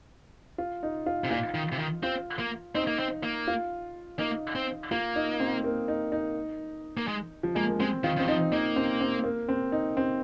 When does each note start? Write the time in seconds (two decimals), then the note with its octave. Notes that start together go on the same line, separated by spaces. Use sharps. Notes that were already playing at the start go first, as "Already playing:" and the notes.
0.58 F4
0.83 D#4
1.06 F4
1.24 C3
1.31 A#2 F4
1.54 D#3
1.72 C3
1.79 D#3
2.03 C4 F4
2.39 A#3
2.75 C4 D#4
2.87 A#3
2.99 C4
3.23 A#3
3.48 F4
4.19 A#3 D#4
4.55 C4
4.91 A#3 F4
5.16 D#4
5.40 C4
5.64 A#3
5.88 D#4
6.12 D#4
6.97 A#3
7.08 G#3
7.43 F3
7.55 G#3 A#3
7.67 A#3
7.80 G#3 C4
8.04 D#3 F4
8.17 D#3 C4
8.27 F3 D#4
8.52 A#3 D#4
8.76 C4
9.00 C4
9.24 A#3
9.49 C4
9.72 D#4
9.97 C4